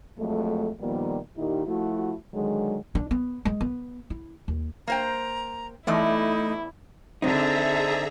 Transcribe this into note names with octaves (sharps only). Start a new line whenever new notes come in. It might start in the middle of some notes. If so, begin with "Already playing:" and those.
F2 F#3 G#3 A3
A#2 D#3 F3 G3 A#3 B3
A#2 D#3 D#4 E4 G4
F3 A3 E4 F#4
D3 D#3 F#3 G#3
D4
B3
G#3
B3
E4
D#2
A#3 C5 G5 A#5
E2 E3 A3 D#4 E4 D5
D3 C4 D#4 G#4 E5 A#5